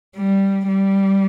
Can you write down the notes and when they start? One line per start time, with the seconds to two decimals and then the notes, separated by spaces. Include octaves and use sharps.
0.17 G3
0.68 G3